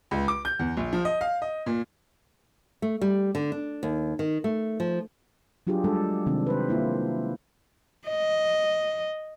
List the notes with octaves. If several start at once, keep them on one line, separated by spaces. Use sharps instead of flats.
C#2
D6
G6
E2
A#1
F3
D#5
F5
D#5
A#2
A3
G3
D3
D4
D#2
D#3
A3
F3
F#3 D4 F4 G4 G#4
G3 G#3 D4 A4
C3 D#3 C4 D4
B4 C5
A#3 E4 F4
D#5